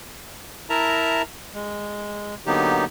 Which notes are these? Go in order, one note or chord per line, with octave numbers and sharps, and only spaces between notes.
E4 A#4 E5 A5 A#5
G#3
D3 F#3 A#3 B3 D#4 G4